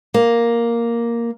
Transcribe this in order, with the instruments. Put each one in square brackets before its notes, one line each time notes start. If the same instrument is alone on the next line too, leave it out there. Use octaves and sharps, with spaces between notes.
[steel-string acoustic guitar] A#3